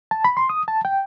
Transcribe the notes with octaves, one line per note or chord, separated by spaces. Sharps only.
A5
B5
C6
D#6
A5
G5